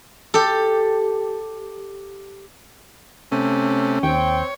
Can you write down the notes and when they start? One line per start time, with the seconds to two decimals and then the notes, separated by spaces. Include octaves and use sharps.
0.34 G4 A4
3.32 C3 A3 C#4
4.03 D#2 C4 C#5 G5